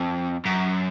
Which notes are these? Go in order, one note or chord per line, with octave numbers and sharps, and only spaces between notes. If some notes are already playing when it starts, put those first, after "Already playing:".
Already playing: F2
F#2